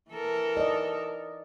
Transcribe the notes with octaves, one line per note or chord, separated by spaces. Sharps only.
E3 A4 A#4
D5 D#5